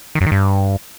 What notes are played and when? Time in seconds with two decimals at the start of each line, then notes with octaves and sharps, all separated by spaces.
0.15 D#3
0.21 F#2
0.26 D#3
0.32 G2